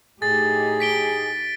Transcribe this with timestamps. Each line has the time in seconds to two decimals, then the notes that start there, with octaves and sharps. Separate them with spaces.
0.22 A2 D#4 G4 G#4 A6
0.80 B6 D7 G7